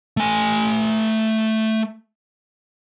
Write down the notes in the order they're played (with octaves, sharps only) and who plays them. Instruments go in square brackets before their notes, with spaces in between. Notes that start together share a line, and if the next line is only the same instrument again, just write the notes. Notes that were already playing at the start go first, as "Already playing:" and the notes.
[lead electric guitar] A3 G#5